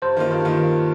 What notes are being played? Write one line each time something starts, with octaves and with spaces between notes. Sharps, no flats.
G2 C5
D#3 A#3 F4
G2
D#3 A#3 F4